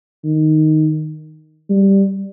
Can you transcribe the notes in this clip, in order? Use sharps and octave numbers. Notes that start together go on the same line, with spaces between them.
D#3
G3